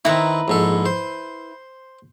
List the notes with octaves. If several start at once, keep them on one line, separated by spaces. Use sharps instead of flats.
D#3 C4 E4 B4 A#5
A#1 G#2 A4
C5